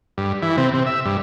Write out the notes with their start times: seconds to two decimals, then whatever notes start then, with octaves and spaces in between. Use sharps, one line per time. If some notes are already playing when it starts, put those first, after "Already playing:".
0.18 G2
0.42 E3
0.57 C3
0.74 C3
0.86 E5
1.05 G2